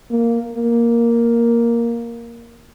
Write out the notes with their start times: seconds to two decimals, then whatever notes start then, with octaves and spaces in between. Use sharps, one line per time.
0.11 A#3
0.53 A#3